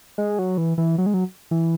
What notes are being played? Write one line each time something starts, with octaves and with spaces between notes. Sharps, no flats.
G#3
F#3
E3
E3
F#3
G#3
F#3
E3